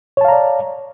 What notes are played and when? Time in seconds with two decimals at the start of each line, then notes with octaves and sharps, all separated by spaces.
0.17 C#5
0.21 A5
0.25 F5
0.28 A#5
0.32 D5